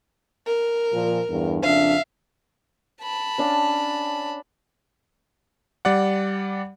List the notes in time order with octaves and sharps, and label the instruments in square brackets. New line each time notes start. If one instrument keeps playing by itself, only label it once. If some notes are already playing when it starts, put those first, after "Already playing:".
[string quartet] A#4
[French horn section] A#2 F3
E2 G2
[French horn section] F2 C#3 D4 [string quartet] E5 F5
[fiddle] A5 B5
[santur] C#4 D4 F5
[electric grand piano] G3 D5 F#5